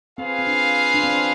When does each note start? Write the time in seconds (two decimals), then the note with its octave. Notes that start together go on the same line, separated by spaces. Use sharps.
0.18 C4 F4 G#4 B4 F5
0.39 C4
0.47 D4
0.94 D4
1.04 C4